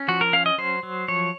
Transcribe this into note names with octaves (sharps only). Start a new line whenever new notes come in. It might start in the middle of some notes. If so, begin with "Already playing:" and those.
Already playing: C#4
F3 F#4
A#4
C#4 F5
D#5
F#3 C5
F#3
F3 C#5